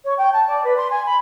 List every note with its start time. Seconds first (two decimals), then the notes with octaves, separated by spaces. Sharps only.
0.04 C#5
0.18 G5
0.33 A5
0.48 D5
0.64 B4
0.77 C6
0.90 G#5
1.06 B5